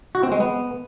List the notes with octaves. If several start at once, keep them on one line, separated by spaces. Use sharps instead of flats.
F#4
C4
G#3
B3